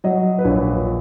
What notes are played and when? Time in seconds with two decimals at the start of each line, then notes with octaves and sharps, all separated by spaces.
0.04 F#3 D#5
0.39 B4
0.45 A#1 C#5